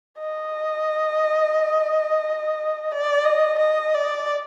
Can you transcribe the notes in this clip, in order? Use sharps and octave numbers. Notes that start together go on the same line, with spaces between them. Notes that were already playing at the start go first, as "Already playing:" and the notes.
D#5
D5
D#5
D#5
D5